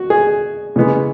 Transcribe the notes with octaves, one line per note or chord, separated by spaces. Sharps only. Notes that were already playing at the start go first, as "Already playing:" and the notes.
Already playing: F#4
G#4
C#3 E3 G#3 B3